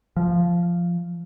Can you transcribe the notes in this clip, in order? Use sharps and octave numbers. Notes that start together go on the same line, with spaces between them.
F3